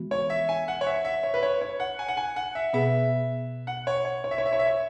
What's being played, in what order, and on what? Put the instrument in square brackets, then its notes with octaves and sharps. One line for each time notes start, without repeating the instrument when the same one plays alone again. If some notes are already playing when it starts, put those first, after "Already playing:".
Already playing: [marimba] E3 G#3 B3 F#4
[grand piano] C#5
E5
G#5
F#5
C#5
E5
E5
C#5
B4
C#5
C#5
F#5
G#5
F#5
G#5
F#5
E5
[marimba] B2 B3 G#4 B4 [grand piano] E5
[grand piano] F#5
C#5
C#5
C#5
E5
C#5
E5
C#5
E5
C#5